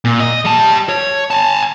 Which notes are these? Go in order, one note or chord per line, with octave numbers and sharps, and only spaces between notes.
A#2
D#5
G3 A5
C#5
G#5 A5